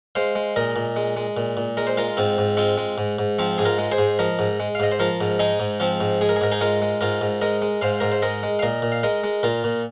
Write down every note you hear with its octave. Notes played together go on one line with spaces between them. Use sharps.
G#3 C5 F5
G#3
A#2 A#4 D#5
A#2
G#3
G#3
A#2
A#2
G#3 A#4
C5
G#3 F4 A#4
G#2 C4 F4
G#2
G#3 C4 F4
G#3
G#2
G#2
F3 C4 F4
G#2 G#4
F4 A#4
G#3
G#4 C5
G#2
F3 A#4 D#5
G#2
G#3
F5
G#2 D#5
C5
F3 F4 A#4
G#2
G#3 D#4 G#4
G#2
F3 C4 F4
G#2
G#3 G#4
A#4
G#4
G#2 A#4
D#4 G#4
G#3 F4 A#4
G#3
G#2 F4 A#4
G#2
G#3 A#4 D#5
G#3
G#2 C5 F5
G#2 A#4
C5
G#3 A#4 D#5
G#3
F5
A#2 A#4 D#5
A#2
F5
G#3 A#4 D#5
G#3
A#2 F4 A#4
A#2